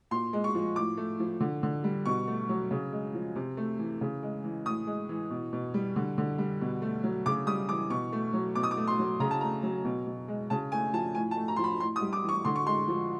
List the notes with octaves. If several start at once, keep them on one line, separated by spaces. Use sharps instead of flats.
A#2 C6
G#3
C#6
F3
A2 D6
A3
F3
D3
D3
G3
B2 C#6
A3
F#3
C#3
G#3
F3
C3
A3
E3
C#3
G#3
E3
A2 D#6
G#3
E3
B2
B2
G3
D3
D3
G3
B2
A3
F#3
C#3 D6
G3 D#6
E3 D6
B2 C#6
A3
F#3
B2 D6
D#6
D6
A3
C6
F#3
C#3 A#5
A5
A3 A#5
F#3
B2
B2
G#3
C#3 A5
A3 G#5
F3 A5
A2 G#5
A5
A3
A#5
F3 C6
B5
A2 C6
D#6
G3
D6
E3
C#6
D3 C6
C#6
G#3 C6
F3